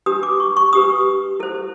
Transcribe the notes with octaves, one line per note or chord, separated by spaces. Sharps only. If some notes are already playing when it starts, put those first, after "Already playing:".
D4 G4 B4 D#6
D6
C#6
C#6
D4 G4 B4 D#6
E4 A4 C5